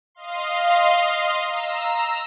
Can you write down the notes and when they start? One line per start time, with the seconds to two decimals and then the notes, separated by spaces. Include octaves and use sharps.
0.15 D#5 F5 C6
1.48 A#5 E6